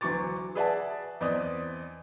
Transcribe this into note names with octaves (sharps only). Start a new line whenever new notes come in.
D2 E3 F#3 C#6 D6 A6
G#4 B4 D5 E5 F#5 A5
E2 C4 B4 D5 D#5 D#6